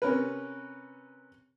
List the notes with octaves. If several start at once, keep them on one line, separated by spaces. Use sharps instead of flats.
C3 C#4 A#4 B4